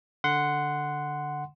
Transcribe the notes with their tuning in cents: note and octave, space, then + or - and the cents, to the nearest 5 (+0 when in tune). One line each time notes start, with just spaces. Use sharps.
D3 +0 F#5 +0 C6 -15